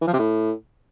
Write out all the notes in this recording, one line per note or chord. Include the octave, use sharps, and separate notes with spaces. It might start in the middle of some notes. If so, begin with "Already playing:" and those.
E3
F3
C3
A2